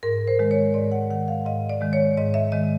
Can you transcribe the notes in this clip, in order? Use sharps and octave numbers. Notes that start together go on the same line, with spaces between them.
G#2 A#4
C5
D#3 G#3
C#5
G#2 D5
F#5
D#3 G#3 F#5
F5
G#2 D#5
D5
D#3 G#3
C#5
G#2 D#5
E5
D#3 G#3 D#5